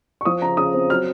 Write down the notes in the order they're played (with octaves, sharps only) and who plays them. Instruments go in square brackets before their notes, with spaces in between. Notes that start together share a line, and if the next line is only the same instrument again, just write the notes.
[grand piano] C#6
F3 D#6
C#3 A#5
C#3 D#6
C4
F#3 F6